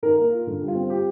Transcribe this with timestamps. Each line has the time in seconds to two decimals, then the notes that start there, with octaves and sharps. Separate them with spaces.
0.03 D#3 A#4
0.18 A#3
0.32 F4
0.47 D3
0.62 G3
0.68 F4
0.75 C4
0.90 G4